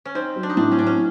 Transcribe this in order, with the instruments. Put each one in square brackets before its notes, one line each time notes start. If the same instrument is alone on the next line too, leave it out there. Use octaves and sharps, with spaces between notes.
[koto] C#4
[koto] C4 [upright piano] D#4
[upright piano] F#3
[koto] D4
D#4
[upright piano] A2 [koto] D4
[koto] C#4
[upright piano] A2 [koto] D4
[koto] C#4